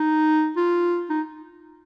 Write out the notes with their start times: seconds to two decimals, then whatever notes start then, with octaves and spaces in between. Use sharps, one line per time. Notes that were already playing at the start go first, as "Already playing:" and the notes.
Already playing: D#4
0.57 F4
1.10 D#4